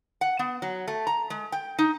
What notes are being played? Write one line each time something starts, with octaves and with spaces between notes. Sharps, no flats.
F#5
B3
F#3
A3
A#5
G#3
G5
D#4